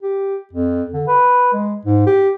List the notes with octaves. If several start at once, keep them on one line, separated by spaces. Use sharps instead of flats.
G4
F2
D3
B4
G#3
G#2
G4